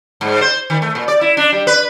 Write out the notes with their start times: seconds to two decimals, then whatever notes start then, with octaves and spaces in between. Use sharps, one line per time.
0.21 G#2
0.41 C5
0.70 D#3
0.82 A3
0.95 A#2
1.08 D5
1.21 E4
1.37 D4
1.52 G3
1.67 B4